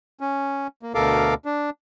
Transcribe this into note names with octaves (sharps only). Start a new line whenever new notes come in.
C#4
A#3
D2 B2 A4 A#4 F5 D6
D4